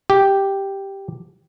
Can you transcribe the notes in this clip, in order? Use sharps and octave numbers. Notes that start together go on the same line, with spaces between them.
G4